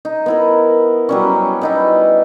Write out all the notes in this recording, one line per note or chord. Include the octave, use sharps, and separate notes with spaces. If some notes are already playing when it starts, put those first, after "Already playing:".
D#4
B3 E4 A#4
F#3 G3 C#4
B3 D#4 E4